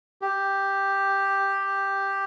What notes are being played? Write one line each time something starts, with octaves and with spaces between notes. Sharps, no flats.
G4